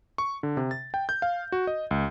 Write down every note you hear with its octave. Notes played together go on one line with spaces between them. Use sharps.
C#6
D3
C3
A6
G5
G6
F5
F#4
D#5
C#2